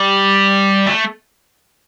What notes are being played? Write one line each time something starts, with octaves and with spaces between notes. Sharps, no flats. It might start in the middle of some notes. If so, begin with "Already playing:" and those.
Already playing: G3
A3